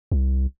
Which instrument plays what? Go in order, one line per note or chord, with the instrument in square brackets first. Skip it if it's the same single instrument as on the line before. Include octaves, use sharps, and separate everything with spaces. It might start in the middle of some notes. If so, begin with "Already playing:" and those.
[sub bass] C2